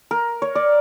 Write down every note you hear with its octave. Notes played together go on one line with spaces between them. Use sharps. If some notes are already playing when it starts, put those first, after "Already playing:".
A#4
C#5
D5